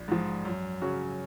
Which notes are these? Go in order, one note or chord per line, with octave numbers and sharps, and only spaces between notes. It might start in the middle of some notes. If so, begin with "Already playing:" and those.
Already playing: A#1
G#2 F3
F#2
C#3 F#3 C#4 F#4